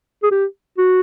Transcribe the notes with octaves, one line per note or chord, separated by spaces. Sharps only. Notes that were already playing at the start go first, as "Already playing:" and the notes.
G#4
G4
F#4